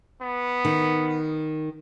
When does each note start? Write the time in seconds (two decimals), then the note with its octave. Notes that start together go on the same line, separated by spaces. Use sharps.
0.22 B3
0.65 D#3